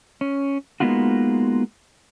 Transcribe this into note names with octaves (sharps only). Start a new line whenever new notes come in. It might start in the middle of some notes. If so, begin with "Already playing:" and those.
C#4
G#3 A#3 B3 D#4 F4 F#4